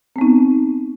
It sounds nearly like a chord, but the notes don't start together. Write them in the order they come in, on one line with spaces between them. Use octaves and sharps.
C4 B3 D#4